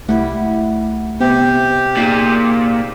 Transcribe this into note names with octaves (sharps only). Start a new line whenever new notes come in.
C2 G3 A3 E4 F#5
C3 B3 G4
A#2 D#4 G#4 B6 E7